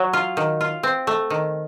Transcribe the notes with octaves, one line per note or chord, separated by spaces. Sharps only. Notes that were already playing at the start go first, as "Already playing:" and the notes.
Already playing: F#3
F4
D#3
F4
C4
A3
D#3